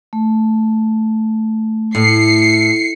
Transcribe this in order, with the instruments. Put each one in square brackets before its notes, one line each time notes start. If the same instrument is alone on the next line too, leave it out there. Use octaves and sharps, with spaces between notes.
[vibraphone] A3
[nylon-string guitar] A2 [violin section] C7 C#7